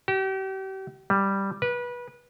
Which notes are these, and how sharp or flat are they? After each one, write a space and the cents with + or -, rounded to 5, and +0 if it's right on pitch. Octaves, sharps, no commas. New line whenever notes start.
G4 -40
G3 +0
B4 -25